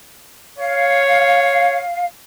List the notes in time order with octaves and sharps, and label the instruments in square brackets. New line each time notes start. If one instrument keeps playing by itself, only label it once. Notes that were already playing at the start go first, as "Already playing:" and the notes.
[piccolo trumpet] C#5 [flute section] F5